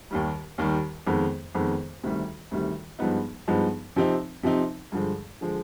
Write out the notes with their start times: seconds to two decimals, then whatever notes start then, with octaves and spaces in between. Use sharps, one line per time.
0.11 D#2 D#3 G3
0.58 D#2 D#3 G3
1.07 F2 D#3 G#3 B3
1.55 F2 D#3 G#3 B3
2.03 D2 C3 D#3 G3
2.51 D2 C3 D#3 G3
2.99 G2 F3 G#3 B3 D#4
3.48 G2 F3 G#3 B3 D#4
3.96 C3 F3 C4 D#4
4.43 C3 F3 C4 D#4
4.92 G2 D3 F3 G#3
5.41 D3 F3 G#3